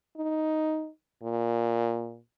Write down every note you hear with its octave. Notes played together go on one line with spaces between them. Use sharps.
D#4
A#2